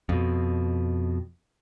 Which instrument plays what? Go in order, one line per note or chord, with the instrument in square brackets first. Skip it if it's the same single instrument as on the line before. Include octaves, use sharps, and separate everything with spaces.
[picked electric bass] F2 B2